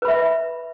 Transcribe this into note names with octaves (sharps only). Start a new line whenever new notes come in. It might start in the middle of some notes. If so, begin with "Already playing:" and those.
B4 E5 B5